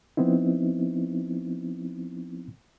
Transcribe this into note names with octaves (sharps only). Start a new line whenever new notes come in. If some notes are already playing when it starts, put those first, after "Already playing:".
F3 B3 C4 D#4 E4